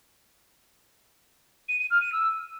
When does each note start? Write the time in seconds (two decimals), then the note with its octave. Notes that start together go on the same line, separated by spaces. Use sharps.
1.69 D#7
1.80 D#7
1.91 F6
2.01 D#7
2.12 E6